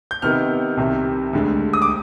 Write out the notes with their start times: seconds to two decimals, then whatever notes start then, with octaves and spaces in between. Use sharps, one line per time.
0.11 G6
0.22 C3 D#3 B3 D#4 F6
0.77 C2 C3 D#3
1.33 D2 D3 G#3
1.73 D#6
1.82 D6